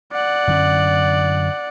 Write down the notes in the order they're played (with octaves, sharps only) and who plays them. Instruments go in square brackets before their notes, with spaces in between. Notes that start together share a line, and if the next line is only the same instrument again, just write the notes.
[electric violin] D5 F#5
[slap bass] F#2 D3 C#4